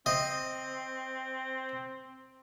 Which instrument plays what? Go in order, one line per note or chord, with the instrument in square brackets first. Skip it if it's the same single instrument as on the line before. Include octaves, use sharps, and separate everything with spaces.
[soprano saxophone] C4 [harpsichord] D#5